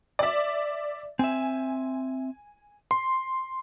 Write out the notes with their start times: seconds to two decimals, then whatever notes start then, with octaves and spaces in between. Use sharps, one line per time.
0.19 D5 E5
1.19 C4 E5 G#5
2.91 C6